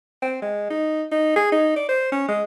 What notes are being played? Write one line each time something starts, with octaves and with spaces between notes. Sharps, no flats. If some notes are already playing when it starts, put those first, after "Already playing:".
C4
G#3
D#4
D#4
G#4
D#4
D5
C5
C#4
G#3